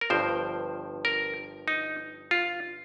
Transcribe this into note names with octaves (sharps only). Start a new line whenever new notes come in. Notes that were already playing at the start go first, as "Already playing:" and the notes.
A#4
G1 G2 F3 C5
A#4
D#4
F4